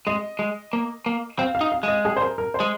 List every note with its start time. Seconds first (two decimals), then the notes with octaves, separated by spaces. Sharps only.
0.07 G#3 D#5
0.39 G#3
0.73 A#3
1.06 A#3
1.38 C4 F5
1.55 F5
1.61 D#4
1.72 F5
1.83 G#3 D#5
2.05 G#4
2.17 C5
2.21 A#4
2.38 A#4
2.54 C5
2.60 G#3